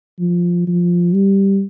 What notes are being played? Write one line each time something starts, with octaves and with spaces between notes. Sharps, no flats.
F3
F3
G3